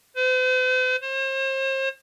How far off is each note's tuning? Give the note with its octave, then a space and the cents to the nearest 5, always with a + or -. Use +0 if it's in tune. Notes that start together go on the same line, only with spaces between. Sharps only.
C5 -45
C5 +40